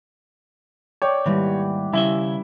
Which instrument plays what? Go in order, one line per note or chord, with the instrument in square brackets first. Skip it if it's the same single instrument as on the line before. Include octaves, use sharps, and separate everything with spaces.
[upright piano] C#5 [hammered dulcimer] D5 G5
[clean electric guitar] D#2 G#2 [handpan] D#3 G3 [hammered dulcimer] E3 B4
[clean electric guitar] C#3 C#4 E5 [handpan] G3 [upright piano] E4